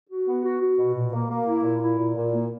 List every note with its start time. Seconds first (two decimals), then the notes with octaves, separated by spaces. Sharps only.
0.10 F#4
0.27 B3
0.44 F#4
0.61 F#4
0.78 B2
0.95 A#2
1.13 A#3
1.29 A#3
1.47 E4
1.64 A#2
1.81 E4
1.98 A#2
2.15 A#2
2.33 A#3